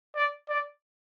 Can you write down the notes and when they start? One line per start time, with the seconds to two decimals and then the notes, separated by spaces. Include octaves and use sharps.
0.15 D5
0.49 D5